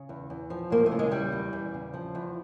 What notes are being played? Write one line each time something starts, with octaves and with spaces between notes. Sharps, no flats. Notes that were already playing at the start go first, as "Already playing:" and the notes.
Already playing: C#3
E2
E2
F3
E2 A#3
A3
C#3
G#3
E2 G3
E2
E2
C#3
F3
E2